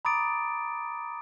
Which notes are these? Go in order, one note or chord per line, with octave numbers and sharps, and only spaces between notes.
A#5 B5 D6 D#6 A6 D7